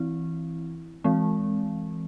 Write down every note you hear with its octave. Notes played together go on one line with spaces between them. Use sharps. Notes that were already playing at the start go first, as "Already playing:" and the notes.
Already playing: E3 C4 E4
E3 G#3 C4